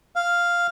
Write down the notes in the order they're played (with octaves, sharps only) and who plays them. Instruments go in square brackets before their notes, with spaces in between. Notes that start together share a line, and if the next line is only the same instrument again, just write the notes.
[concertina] F5